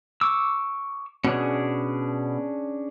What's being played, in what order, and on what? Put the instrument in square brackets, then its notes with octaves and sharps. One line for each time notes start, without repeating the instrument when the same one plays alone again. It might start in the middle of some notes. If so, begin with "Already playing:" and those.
[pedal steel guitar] C#6 D6 E6
[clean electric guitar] B2 [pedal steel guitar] C#4 D4 G#4